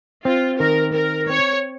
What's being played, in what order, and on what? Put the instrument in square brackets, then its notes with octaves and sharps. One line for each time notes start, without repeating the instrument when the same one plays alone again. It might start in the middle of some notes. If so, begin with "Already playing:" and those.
[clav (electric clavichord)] C4 [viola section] F4
[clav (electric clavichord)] D#3 [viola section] A#4
[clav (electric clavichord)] C4 [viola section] A#4
[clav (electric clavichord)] C4 [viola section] C#5